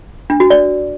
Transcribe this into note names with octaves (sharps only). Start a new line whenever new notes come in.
D4
F#4
D5